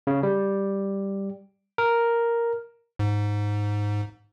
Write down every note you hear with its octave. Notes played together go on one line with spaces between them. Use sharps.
C#3
G3
A#4
G#2